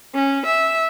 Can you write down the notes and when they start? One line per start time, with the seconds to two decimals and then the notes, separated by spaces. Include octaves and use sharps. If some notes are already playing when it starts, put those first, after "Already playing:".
0.15 C#4
0.46 E5